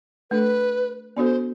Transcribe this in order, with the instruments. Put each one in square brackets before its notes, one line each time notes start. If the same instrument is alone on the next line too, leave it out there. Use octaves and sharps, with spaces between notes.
[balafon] A3 D4 A4 [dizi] B4
[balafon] B3 D4 F#4 A4 [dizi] C5 D5